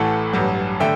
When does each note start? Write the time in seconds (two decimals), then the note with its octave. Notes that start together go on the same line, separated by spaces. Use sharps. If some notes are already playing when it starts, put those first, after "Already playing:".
Already playing: A1 A2 E3 A3 F#5 A5
0.33 A1 G2 F#3
0.80 D3 A3 E5 G5